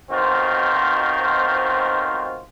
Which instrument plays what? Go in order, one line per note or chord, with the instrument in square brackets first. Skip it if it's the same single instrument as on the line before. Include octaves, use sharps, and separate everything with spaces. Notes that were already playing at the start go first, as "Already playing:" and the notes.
[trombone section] B1 D#3 C4 F4 F#4 C5